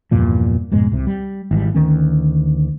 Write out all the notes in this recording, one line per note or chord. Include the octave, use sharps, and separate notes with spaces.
E2 G2 A#2 F3
F2 G#2 B2 G#3
C2 C3
G3
G#1 E3 G3
D2 D#3 C#4